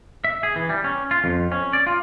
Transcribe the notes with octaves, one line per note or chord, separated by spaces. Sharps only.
E5
G#4
E3
G3
C#4
F4
F2
C#4
D5
F4